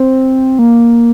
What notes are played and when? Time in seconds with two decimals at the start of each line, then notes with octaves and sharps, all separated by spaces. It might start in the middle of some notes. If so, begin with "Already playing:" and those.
Already playing: C4
0.59 A#3